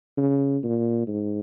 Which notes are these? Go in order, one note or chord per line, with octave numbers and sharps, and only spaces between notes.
C#3
A#2
G#2